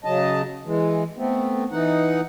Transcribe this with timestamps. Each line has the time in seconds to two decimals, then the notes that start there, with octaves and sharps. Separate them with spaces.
0.04 C#3 F#3 D#5 A5
0.65 E3 G#3
1.17 A3 B3 C4
1.71 E3 D#4 F#5